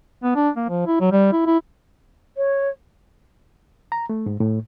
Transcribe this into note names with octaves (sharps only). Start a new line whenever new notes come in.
B3
D4
A#3
F3
E4
F#3
G3
E4
E4
C#5
A#5
A3
G#2
A2